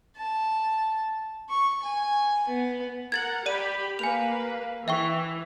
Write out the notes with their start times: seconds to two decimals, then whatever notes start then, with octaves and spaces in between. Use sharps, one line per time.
0.17 A5
1.49 C#6
1.83 G#5
2.48 B3
3.12 A#4 F#5 G#6 A6 F#7
3.46 G4 D5 B5 D#7
3.99 A#3 B4 G#5 F7
4.88 E3 E5 G5 C#6